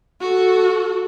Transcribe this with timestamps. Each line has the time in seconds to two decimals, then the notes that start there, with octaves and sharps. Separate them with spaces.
0.21 F#4 A4